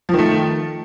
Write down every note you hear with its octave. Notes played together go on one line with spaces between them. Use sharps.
D#3 F3 A3